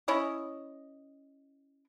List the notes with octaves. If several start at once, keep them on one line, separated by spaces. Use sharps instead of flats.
C#4 E4 C#5 D#5